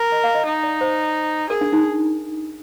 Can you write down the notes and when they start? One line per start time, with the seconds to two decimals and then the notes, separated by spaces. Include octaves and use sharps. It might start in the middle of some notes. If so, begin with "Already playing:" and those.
Already playing: A#4
0.12 D#5
0.24 F5
0.35 D#5
0.46 D#4 D#5
0.63 D5
0.81 C5
1.50 G#4 A#4
1.61 D4
1.72 D#4